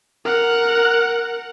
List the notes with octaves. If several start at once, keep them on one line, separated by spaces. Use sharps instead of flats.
A#4 F#5